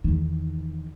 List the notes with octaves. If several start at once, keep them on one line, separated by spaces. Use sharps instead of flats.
E2 D#3